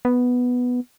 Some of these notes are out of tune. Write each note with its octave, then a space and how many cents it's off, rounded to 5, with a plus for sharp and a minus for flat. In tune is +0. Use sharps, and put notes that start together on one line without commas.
B3 +0